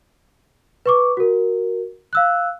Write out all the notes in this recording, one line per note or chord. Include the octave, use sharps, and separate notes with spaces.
B4 C#6 D6
F#4 A#4
F5 E6 F#6